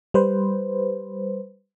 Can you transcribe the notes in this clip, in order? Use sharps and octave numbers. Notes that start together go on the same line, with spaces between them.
G3 B4 C5